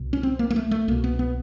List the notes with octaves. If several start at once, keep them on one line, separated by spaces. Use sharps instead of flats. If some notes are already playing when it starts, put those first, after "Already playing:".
Already playing: C2 B2
C#4
C4
A#3
A#3
A3
A3
C2 B2 A#3
B3
B3